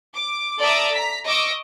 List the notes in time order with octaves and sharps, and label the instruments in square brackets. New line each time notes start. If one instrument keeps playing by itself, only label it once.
[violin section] D6
A4 D5 E5 A#5 D6 D#6
A#5 B6
D#5 C#6 D6 E6